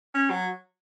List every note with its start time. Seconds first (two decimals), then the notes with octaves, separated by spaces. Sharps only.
0.14 C#4
0.30 F#3